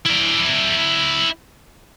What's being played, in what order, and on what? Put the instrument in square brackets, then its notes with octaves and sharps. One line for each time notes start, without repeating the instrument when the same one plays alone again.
[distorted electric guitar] E4 D5